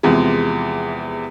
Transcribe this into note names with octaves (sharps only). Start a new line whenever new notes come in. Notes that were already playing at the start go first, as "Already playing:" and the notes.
E2 C3 F3 G#3